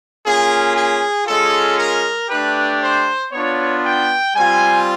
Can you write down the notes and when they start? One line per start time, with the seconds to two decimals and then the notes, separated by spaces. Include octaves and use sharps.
0.25 A#3 C#4 F4 G#4
0.76 G#4
1.26 G#3 C#4 F4 A4
1.79 A#4
2.29 A3 D4 G4 B4
2.81 C5
3.32 B3 D4 F4 C#5
3.84 G5
4.35 G3 C4 F4 G#5